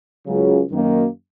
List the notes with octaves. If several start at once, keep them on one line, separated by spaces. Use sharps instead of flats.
C#2 C#3 F#3
F#2 D#3 A#3